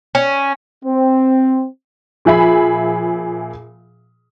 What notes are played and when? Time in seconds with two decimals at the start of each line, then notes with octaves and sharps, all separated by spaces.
0.15 C#4
0.85 C4
2.25 A#2 F3 G#4 E5 B5